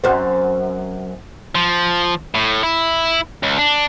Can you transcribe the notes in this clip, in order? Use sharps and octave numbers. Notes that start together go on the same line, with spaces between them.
F#2 C4
F3
A2
E4
C#2
D4